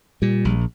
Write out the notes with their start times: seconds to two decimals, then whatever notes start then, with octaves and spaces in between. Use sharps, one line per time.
0.22 A#2 G3
0.45 A#1